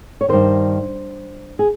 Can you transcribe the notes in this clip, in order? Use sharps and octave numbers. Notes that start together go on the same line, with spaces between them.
C#5
G2 D#3 C5
G#4